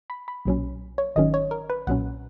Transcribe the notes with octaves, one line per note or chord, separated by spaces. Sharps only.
B5
B5
B1 A#2 F#3 C#4
C#5
G#1 G#2 D#3 F#3 C#4 D#5
C#5
A#4
B4
B1 A#2 F#3 C#4 F#5